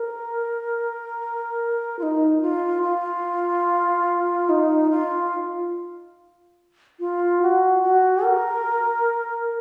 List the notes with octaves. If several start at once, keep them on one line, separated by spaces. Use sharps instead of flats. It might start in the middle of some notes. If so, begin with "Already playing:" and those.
Already playing: A#4
F4
D#4
F4
F4
D#4
F4
F4
F#4
F#4
A#4